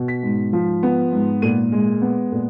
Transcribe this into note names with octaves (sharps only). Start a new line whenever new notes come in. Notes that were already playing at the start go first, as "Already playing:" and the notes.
Already playing: B2
B6
G#2
F3
B3
G#2
A#2 D#7
G#3
B3
A#2